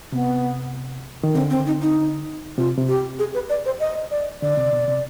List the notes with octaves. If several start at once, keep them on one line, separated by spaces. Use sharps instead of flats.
C3 B3
D#3
D3 C4
C4
D#4
D#4
C3 F4
C3
G4
G#4
B4
D5
C5
D#5
D5
D3 D5
C3
B2
C3